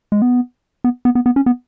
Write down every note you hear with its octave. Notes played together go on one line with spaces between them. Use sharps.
G#3
B3
B3
B3
B3
B3
C#4
B3